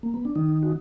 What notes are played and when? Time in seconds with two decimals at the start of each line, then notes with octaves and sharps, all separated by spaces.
0.03 A#3
0.14 B3
0.25 D4
0.36 D#3 D#4
0.63 F#4